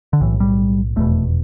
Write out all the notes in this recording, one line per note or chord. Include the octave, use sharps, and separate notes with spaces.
D3
B1 A2 E3
G3
F1 E2 B2 A3